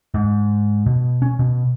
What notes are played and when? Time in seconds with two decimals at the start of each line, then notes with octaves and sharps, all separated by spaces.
0.14 G#2
0.86 B2
1.22 C#4
1.39 B2